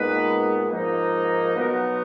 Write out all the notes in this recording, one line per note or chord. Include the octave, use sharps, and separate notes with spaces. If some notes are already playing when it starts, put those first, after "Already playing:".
Already playing: A#2 G#3 B3 D#4 B4
G#2 F3 A#3 D#4
B2 F#3 B3 D#4 A#4